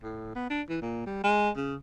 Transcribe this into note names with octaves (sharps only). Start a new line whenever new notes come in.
A2
B3
D4
E3
A#2
G3
G#3
C#3